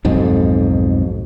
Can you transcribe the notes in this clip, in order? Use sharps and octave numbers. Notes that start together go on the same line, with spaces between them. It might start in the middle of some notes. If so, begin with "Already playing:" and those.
B1 F2 G#2